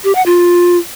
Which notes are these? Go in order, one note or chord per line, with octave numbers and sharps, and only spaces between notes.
G4
F#5
F4